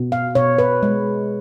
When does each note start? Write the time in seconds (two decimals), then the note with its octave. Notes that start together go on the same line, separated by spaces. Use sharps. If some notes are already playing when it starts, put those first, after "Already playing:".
Already playing: B2
0.12 F5
0.35 B2 C#5
0.58 B4
0.83 G#3